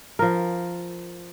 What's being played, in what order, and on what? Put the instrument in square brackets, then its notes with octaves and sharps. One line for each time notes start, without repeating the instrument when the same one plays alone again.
[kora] F3 A#4